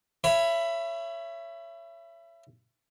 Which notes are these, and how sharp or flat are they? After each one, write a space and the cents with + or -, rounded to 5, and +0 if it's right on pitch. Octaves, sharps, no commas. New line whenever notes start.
C#5 +0 E5 +30 B5 +10